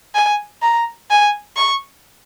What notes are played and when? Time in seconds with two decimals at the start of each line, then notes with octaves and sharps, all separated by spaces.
0.15 G#5
0.62 A#5
1.10 G#5
1.56 C#6